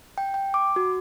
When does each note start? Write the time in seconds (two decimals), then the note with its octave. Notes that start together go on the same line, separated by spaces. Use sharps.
0.18 G5
0.34 G5
0.54 D6
0.76 F#4